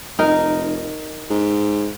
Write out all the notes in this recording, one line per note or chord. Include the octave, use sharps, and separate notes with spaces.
F1 D#4 A#4
G#2